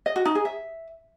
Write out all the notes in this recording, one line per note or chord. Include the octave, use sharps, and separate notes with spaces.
D#5
F#4
D#4
G#4
E5